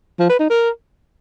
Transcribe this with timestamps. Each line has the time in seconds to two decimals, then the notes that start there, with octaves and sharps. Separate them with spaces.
0.19 F3
0.30 B4
0.40 D#4
0.50 A#4